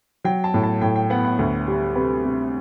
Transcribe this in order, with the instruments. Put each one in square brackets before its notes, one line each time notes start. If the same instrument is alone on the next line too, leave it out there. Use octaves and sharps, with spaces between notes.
[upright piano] F#3 G5
A5
A2
A5
A2 G5
G5
B3 F#5
F#5
D2
G3
C3 B4
C3